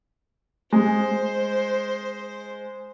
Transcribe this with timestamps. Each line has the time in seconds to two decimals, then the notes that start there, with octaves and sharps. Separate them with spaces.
0.73 G#3 C5